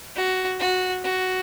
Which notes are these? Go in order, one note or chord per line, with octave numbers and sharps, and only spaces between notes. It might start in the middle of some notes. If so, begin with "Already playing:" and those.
F#4
F#4
F#4